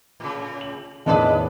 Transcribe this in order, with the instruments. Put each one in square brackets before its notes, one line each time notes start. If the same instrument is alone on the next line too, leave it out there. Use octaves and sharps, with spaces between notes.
[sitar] A2 C#3
[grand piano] F#7
[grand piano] E2 A2 D#3 [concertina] D4 [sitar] E4 G#4 B4 [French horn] D#5